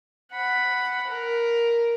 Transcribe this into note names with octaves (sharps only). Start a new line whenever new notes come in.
F#5 B5
A#4